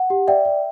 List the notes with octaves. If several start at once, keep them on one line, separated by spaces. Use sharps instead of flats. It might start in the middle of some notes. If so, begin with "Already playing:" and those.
Already playing: F#5
G4
D5 E5 G5
D5